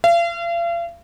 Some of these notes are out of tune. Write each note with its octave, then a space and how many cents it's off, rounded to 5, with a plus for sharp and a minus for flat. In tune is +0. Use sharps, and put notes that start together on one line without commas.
F5 -40